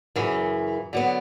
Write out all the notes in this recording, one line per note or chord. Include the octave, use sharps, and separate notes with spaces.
F#2 C#3 E3
D3 F#3 B3